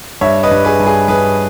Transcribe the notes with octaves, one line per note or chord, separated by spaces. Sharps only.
G2 C#5 E5
B4 D#5
G2
G#4 B4
G2
G#4
G2 G#4 B4